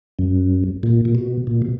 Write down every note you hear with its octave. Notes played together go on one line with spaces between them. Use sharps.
F#2
A#2
A#2
B2
A#2
B2